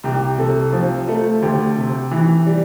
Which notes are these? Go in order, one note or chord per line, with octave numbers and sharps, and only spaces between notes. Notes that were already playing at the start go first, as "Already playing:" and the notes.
C2 G4
C3 A4
F3
A3
D2 G4
C3
E3
G3